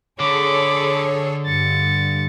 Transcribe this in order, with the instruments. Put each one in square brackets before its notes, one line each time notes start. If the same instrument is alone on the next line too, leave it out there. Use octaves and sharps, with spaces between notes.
[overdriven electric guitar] D3 [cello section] G#4 A4 C#5 [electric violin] B5 D6
[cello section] G2 [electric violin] A6 C#7